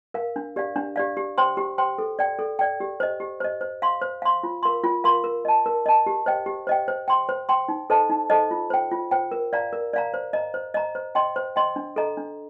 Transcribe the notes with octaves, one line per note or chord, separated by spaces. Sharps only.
A#4 F5
D4
G4 D5 F5
D4
G4 D5 F5
G4
C5 G5 C6
G4
C5 G5 C6
A4
D5 G5
A4
D5 G5
G4
C5 D#5
G4
C5 D#5
C5
F5 C6
C5
F5 C6
F4
A#4 F5 C6
F4
A#4 F5 C6
A#4
D#5 A5
A#4
D#5 A5
G4
C5 D#5 G5
G4
C5 D#5 G5
C5
G5 C6
C5
G5 C6
D#4
A4 C5 D#5 A5
D#4
A4 C5 D#5 A5
F4
C5 G5
F4
C5 G5
A#4
D5 F5 A#5
A#4
D5 F5 A#5
C5
D#5 A#5
C5
D#5 A#5
C5
D#5 G5 C6
C5
D#5 G5 C6
D4
A4 D#5 A#5
D4